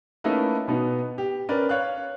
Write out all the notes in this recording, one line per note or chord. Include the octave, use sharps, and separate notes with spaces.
A3 A#3 C#4 D#4 E4 B4
B2 B3 D#4
G4
C#4 A#4 B4 D5
C#5 F5 F#6